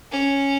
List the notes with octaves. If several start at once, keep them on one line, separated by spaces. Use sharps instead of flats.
C#4